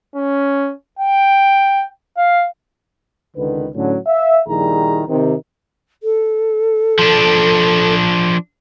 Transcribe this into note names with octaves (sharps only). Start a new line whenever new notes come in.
C#4
G5
F5
C#2 D3 D#3 B4
A2 D3 F#3 C#4
E5 F5
A#1 D#3 G3 E4 G#4 A#5
C3 D#3
A4
F3 D4